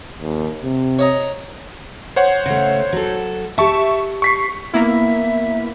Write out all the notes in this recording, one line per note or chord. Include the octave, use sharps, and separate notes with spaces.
D#2
C3
C#5 D#5 A#5
C5 C#5 F#5
C#3 A3
F#3 A4
G4 E5 A5 C#6
C#6 B6 C7
A#3 B3 E4 E5